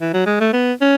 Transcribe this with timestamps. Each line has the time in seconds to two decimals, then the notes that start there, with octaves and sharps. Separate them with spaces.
0.01 E3
0.13 F#3
0.26 G#3
0.40 A3
0.53 B3
0.81 C#4